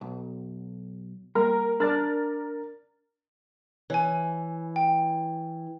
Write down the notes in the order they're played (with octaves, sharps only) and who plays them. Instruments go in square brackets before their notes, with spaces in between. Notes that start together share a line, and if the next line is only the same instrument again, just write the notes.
[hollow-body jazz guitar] B1
[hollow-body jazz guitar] G3 A#3 [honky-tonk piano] A#4
[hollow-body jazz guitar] D4 D5 [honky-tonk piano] A#4 F6 A6
[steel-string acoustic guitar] E3 [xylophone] C#5 G#5
[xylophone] G5